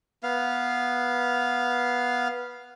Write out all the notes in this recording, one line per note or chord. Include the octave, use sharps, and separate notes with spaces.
B3 F5